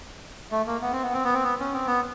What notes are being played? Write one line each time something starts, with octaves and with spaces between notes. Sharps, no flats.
A3
A#3
B3
C4
B3
C4
B3
C4
B3
C#4
C4
B3